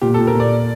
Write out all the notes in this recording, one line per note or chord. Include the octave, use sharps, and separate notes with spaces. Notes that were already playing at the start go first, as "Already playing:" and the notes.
A#2 G4
A4
A#2
A#4
A#2 D5